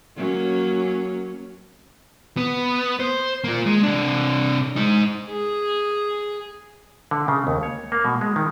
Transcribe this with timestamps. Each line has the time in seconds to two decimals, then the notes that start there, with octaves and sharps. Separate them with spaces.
0.16 F#3 A#3 C#4
2.37 B3
3.00 C5
3.44 A#3 F4
3.66 G#3
3.83 C3 D4
4.76 G#3 D#4
5.30 G#4
7.11 D3
7.28 C#3
7.47 D#2
7.63 C#5
7.92 A#3
8.05 B2
8.21 G#3
8.36 D#3